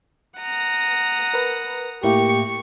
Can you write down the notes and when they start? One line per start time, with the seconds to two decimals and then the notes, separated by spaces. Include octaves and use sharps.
0.38 F#5 A#5 D#6
1.34 A#4 B4
2.04 A2 A#3 E4 G4 C#6